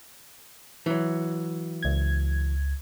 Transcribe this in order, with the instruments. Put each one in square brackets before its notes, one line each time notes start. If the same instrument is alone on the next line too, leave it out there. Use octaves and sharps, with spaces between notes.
[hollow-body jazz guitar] E3 F#3
[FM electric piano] C#2 G#6